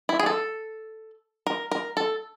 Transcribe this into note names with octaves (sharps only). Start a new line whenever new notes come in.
E4
G#4
A4
A#4
A#4
A4